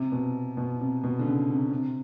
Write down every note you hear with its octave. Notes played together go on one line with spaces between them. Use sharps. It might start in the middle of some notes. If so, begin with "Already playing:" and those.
Already playing: C3
B2
B2
C3
B2
D3
C#3
C3
C3